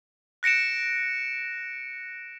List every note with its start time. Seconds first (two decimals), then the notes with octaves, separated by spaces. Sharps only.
0.43 F#6 A#6 C#7 D7 E7